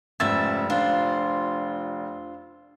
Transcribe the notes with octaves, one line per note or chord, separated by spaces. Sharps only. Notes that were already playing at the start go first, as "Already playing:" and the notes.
F1 G#2 C#3 E5 E6 A6
D4 F4 C5